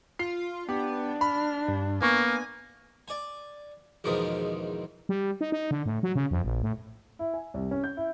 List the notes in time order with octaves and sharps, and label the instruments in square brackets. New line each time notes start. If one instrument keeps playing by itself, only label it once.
[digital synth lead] F4 [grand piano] C7
[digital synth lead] B3 [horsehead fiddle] D4 [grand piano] G4
[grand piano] B5 [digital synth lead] F6
[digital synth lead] G2
[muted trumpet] A#3 [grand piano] B3 C#6 [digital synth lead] G#5
[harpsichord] D5 G#5
E2 G#2 B2 D#3 F3
[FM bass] G3
D#4
D#4
D3
A2
F#3
C#3
F2
A#1
A2
[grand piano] E4
G#5
C2
C#4
G6
E4